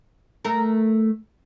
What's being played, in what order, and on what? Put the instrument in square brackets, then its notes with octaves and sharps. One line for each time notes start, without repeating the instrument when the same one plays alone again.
[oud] A3 A#4